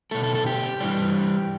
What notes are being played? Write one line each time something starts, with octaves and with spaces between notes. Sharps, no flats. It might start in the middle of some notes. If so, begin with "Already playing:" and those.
B2 A3 A4
A4
A4
G4
G2 E3 G3